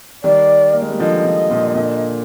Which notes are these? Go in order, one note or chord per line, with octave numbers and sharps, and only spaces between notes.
D#3 G3 D5
A#3
G#3
G3
D3 F3 D#5
D3 F3
A#2 D3
A#2 D3